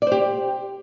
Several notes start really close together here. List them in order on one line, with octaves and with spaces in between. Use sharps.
D5 C5 G4